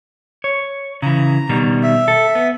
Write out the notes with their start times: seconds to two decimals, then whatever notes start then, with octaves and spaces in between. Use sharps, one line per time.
0.44 C#5
1.02 C#3 E3 A#5
1.49 B2 D#3 G3
1.83 E5
2.08 A4
2.35 B3